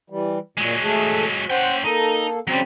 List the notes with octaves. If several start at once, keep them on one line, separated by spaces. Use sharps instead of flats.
E3 G3
A#2 F#3 G#3
A3 G#4 A4
C#4 C5 F#5 G5
A#3 D#4 A4
C#3 F#3 G3 C4